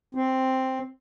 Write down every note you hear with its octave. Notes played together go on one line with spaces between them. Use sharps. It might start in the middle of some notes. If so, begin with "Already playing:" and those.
C4